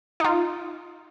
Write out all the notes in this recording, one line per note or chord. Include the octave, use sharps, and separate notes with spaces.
D#4 F4